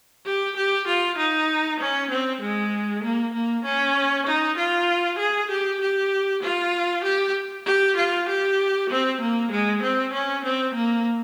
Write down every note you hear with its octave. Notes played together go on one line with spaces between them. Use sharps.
G4
G4
F4
D#4
C#4
C4
G#3
A#3
A#3
C#4
D#4
F4
G#4
G4
G4
F4
G4
G4
F4
G4
C4
A#3
G#3
C4
C#4
C4
A#3